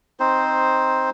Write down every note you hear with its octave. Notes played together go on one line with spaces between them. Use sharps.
C4 D#4 C5